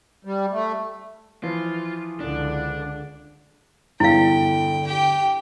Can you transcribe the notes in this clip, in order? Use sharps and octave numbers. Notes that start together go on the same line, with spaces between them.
G3
A3
E3 F3 F4
C#2 D3 D4
E2 G2 D3 E4 F5 G5
G4 G5